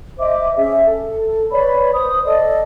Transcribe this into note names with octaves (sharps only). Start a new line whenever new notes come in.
C5 D#5 E5 D6
C#4 G#4 E5
A4
B4 C#5 D5 B5
C5 D#6
A4 D5 D#5